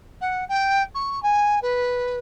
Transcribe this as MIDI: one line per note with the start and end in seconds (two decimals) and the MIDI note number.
0.21 0.44 78
0.49 0.83 79
0.94 1.22 85
1.22 1.59 80
1.62 2.18 71